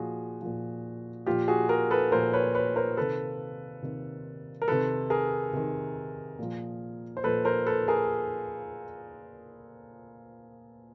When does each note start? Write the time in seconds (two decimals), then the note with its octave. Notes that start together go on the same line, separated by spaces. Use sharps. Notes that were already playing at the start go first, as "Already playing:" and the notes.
Already playing: A#2 F3 F#4 G#4
0.41 A#2 F3
1.26 A#2 F3 F4 G4
1.48 F#4 G#4
1.69 G#4 A#4
1.91 A4 B4
2.12 A#2 F3 A#4 C5
2.33 B4 C#5
2.55 B4 C#5
2.76 A#4 C5
2.97 C3 D#3 A4 B4
3.82 C3 D#3
4.62 A#4
4.68 C3 D#3 A4 B4
5.10 G#4 A#4
5.53 C3 D#3
6.38 A#2 F3
7.17 C5
7.23 A#2 F3 A4 B4
7.45 A#4 C5
7.66 A4 B4
7.88 G#4 A#4